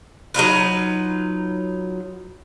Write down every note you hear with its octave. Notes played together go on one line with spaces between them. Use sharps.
F#3 D#4 F4 B4